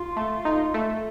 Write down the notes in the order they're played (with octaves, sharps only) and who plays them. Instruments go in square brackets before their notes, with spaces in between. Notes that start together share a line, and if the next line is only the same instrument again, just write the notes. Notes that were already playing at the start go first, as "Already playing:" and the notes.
Already playing: [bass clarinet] F4
[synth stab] A3
D#4
A3